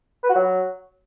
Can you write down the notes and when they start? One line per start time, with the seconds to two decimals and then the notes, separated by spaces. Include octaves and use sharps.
0.23 B4
0.29 F#4
0.35 F#3